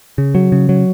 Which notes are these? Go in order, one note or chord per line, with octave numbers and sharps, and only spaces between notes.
C#3
F#3
C#3
F#3